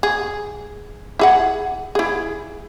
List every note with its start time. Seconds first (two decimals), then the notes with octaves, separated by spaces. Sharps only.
0.03 G#4
1.19 E4 G#4 F#5
1.95 E4 G#4